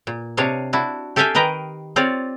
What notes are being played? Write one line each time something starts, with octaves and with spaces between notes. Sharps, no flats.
A#2
C3 D4 C#5 D#5 F5
D4 E4 F#4
G4 A4 E5 F5 G5 G#5
D#3 A#4 B4 D#5 G5 A#5
C4 F4 C#5 D5